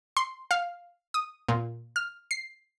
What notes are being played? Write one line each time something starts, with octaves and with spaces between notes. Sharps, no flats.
C6
F5
D#6
A#2
F6
C7